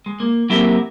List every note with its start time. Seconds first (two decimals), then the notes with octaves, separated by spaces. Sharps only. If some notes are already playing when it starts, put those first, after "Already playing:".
0.06 G#3
0.20 A#3
0.50 F#3 A#3 C4 E4 G4 A#4